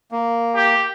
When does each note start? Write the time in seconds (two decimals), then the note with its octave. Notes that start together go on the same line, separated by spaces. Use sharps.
0.12 A#3
0.55 G4